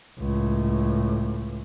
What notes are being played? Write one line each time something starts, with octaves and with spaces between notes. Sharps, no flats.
C#2 A2